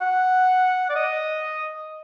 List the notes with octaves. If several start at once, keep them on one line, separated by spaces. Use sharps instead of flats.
F#5
D5
D#5